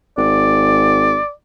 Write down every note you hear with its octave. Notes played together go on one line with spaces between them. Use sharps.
G#1 D5